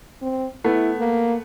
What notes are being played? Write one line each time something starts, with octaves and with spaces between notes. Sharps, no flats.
C4
A3 B3 E4
A#3